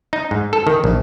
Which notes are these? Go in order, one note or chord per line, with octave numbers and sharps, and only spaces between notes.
D#4
G#2
A4
D#3
A#1